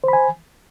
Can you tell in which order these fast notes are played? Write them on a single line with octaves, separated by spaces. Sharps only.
C5 B5 G#5